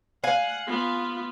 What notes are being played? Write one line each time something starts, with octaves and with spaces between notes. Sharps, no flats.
F5 F#5 G#5
B3 F4